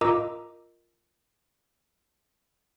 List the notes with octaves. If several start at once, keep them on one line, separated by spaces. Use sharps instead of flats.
F4 A#4 D#5 A#5 D6 E6